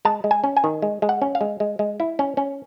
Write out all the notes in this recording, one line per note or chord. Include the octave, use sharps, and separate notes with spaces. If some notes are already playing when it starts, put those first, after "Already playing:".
G#3 A5
G#3
G#5
C#4
G#5
D#3
G#3
G#3
F#5
C#4
F5
G#3
G#3
G#3
E4
C#4
C#4